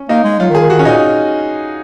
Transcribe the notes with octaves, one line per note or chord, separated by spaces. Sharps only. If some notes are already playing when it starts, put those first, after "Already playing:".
Already playing: C#4
A#3 D#4
G#3
F#3 F4
D#3
G#4
D#3
D#3 F#4
C#4
A#2 D#4